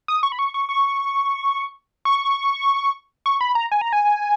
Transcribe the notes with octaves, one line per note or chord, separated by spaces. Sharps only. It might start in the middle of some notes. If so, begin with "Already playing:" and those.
D#6
C#6
B5
C#6
C#6
C#6
C#6
C#6
B5
A#5
G#5
A#5
G#5